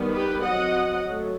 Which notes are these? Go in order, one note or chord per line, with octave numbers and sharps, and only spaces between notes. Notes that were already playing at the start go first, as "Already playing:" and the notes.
Already playing: D#3 G3 B3
G4 B4
F#3 C4 D#5 F#5
F#3 A3